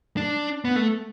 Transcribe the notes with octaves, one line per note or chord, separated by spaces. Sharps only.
D4
B3
A3